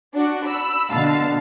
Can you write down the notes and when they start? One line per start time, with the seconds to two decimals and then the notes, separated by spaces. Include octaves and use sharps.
0.14 D4 F#4
0.45 B5 E6
0.93 B2 D3 F5 A5